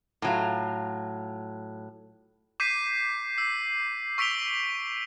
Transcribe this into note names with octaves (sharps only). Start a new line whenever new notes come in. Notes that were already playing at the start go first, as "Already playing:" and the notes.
A2 F#3 F4
D6 G6 B6 C7 D#7
E6 C7
C#6 E6 B6 D7 F7 G7